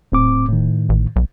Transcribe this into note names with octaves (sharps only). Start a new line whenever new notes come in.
D#1 A2 C4 D6
A2 D#3
A1
B1